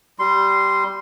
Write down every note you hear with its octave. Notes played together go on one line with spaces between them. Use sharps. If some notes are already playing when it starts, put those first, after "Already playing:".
G3 C6